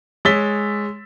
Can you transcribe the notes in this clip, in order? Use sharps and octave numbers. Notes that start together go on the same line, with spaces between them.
G#3 C#5 E6 A6 B6 G7